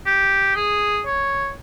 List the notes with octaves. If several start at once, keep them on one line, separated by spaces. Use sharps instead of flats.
G4
G#4
C#5